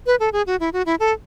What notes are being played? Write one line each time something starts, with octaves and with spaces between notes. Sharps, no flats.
B4
A4
G#4
F#4
E4
F#4
E4
A4